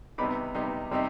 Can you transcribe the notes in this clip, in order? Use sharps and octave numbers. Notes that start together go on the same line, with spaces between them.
C3 G3 B3 D#4 B5 D6
C3 G3 B3 D#4
C3 G3 C4 D#4